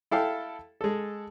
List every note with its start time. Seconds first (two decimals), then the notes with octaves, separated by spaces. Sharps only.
0.11 E4 A4 F5 G5
0.81 G#3 A4